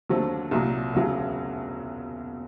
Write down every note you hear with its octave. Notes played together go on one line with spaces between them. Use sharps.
D#2 D3 F#3 A3 C4
C2 A#2 F#3 A#3
E1 D2 C#3 F#3